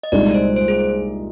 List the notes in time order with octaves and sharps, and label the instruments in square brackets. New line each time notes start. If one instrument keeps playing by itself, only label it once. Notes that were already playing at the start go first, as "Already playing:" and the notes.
[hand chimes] D#5
[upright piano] C2 A#2 G#3 D#4 [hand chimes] D5
[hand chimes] C5
C5
G#4